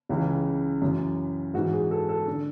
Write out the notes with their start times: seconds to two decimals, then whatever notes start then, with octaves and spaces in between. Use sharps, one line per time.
0.09 C#2 C#3 E3
0.82 F#2 E3
1.54 G#2 E3 F#4
1.73 G#4
1.91 A4
2.09 A4
2.27 D3